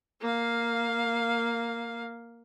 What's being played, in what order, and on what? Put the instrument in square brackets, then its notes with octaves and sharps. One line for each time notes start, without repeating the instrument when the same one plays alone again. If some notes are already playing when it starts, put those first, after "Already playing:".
[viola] A#3 F5